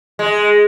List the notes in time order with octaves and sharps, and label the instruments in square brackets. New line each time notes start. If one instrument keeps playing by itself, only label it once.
[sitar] G#3